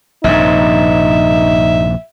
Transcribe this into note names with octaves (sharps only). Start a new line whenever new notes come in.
A#1 G2 C3 D#4 E5